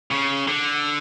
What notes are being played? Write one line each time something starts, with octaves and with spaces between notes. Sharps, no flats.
C#3
D3